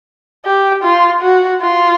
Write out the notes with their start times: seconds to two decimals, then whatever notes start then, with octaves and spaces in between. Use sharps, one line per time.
0.45 G4
0.83 F4
1.21 F#4
1.61 F4